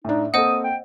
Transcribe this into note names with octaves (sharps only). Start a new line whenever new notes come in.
A2 D4 D#4
A#3 C4 A4 C5 D#5 F#5 D#6
G5